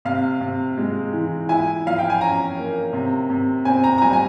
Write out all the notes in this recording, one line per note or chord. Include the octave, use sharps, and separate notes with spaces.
C3 F5
C3
G#3
E3
E4 G#5
F3 F5
G5
G#5
C#4 A#5
A#3
C3
C3
C4 G#5
A#5
A#5
G3 G#5
G#5